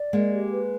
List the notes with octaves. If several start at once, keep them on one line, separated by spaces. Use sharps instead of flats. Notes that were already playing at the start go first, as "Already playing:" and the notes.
Already playing: D5
G#3 A#3 D#5
G4
B4